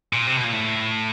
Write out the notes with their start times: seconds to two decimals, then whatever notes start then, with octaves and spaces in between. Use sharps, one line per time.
0.13 A#2
0.27 C3
0.36 B2
0.44 A#2
0.53 A2